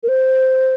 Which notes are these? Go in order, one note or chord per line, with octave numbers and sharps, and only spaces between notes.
A#4
C5